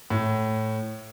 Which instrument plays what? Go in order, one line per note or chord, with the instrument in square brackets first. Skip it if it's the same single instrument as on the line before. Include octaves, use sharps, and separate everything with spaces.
[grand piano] A2